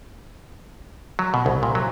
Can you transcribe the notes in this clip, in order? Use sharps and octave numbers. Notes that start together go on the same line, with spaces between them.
F#3
B2
C2
A#2
F#3